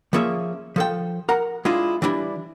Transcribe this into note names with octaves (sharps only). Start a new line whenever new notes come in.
F3 A#3 C#4 G#4 E5
F3 A4 G5
A#4 F#5 A#5
G#3 D4 E4 F4 G#4
E3 G3 D4 E4